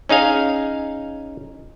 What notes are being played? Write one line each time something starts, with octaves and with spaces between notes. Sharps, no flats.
C#4 D#4 G#4 F5 G#5